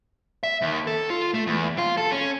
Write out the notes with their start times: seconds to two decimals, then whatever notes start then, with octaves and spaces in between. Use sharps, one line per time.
0.43 E5
0.61 D#2
0.87 A4
1.10 F4
1.34 A3
1.47 E2
1.78 F4
1.97 A4
2.12 C#4